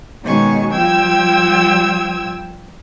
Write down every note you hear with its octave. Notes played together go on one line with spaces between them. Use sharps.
B2 D#3 G#3 C#4 G#5 C#6
F3 G3 F4 G5 E6 G#6